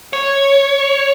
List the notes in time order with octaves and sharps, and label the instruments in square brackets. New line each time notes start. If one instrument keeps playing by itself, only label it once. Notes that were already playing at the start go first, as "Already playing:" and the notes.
[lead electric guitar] C#5